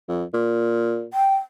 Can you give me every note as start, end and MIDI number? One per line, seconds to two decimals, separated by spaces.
0.08 0.24 41
0.34 1.06 46
1.13 1.35 79